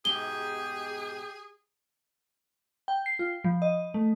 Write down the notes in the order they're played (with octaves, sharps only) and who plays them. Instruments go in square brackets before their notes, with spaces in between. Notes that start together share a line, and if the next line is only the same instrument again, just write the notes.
[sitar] G#2 B2 [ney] G4 [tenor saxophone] G#4 [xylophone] G7
[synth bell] G5
C7
F4
F3
D#5
A3